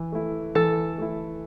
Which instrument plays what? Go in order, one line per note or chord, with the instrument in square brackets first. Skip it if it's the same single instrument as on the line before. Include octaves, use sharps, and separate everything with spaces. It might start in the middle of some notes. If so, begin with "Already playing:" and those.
Already playing: [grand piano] E3
A3 E4
[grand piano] E3 [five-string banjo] A4
[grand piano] A3 E4